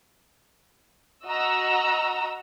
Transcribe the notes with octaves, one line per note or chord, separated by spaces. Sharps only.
F#4 D#5 A#5 E6